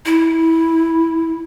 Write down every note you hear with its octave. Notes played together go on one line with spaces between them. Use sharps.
E4